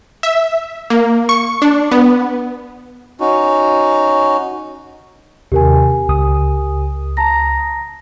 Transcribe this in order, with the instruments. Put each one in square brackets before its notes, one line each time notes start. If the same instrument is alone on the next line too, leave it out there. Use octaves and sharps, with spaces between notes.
[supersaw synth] E5
A#3
C#6
D4
B3
[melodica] C#4 D#4 F#4
[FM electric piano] D#2 C3 [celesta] G4 A#4 G#5
[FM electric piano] C#2 D#6
[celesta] A5 A#5 A#6